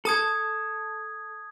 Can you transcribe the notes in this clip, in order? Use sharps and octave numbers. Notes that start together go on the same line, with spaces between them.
A4 A5 D#6 G#6